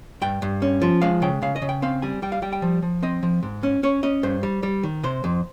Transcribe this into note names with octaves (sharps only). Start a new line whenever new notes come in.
G2 G5
G2
C#4
F3
G#3 F5
C#3 G5
C#3 F5
D#5
C#3
G5
C4 F5
G3 G#5
G3 G5
F5
G3 G5
G5
F3
F3
C4 D#5
F3
G#2
C#4
C#4 C#5
C#4 D#5
G2 C5
G3
G3
D#3
C3 C5
F2